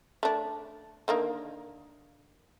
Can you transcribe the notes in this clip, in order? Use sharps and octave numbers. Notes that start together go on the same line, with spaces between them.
A3 D4
D3 D#3 A#3